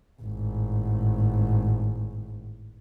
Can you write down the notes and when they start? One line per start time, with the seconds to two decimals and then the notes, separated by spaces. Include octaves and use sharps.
0.22 G#1 A2